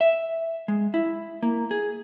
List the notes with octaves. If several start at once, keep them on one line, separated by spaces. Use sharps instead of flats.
E5
G#3
E4
A#3
G#4